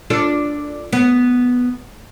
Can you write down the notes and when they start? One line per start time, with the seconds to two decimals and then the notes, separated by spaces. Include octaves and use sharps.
0.10 D4 F4 A4
0.93 B3